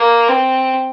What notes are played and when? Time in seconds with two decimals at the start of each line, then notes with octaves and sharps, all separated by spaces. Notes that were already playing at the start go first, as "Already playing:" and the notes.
Already playing: A#3
0.28 C4